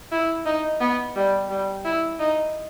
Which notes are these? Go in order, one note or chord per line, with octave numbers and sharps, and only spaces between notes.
E4
D#4
B3
G3
G3
E4
D#4